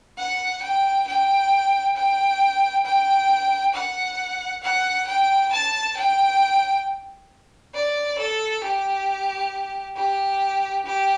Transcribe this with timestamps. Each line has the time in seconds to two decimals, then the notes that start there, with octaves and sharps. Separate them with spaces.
0.18 F#5
0.62 G5
1.07 G5
1.96 G5
2.85 G5
3.74 F#5
4.62 F#5
5.07 G5
5.52 A5
5.97 G5
7.75 D5
8.18 A4
8.64 G4
9.97 G4
10.86 G4